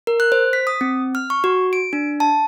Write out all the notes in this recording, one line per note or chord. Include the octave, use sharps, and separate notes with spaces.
A#4
F#6
C5
B6
D#6
C4
F6
C#6
F#4
D7
D4
A5